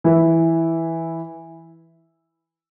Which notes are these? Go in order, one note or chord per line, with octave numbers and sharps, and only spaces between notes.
E3 E4